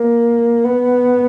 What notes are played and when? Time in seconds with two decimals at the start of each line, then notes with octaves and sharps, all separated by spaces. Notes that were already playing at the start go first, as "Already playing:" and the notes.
Already playing: A#3
0.64 B3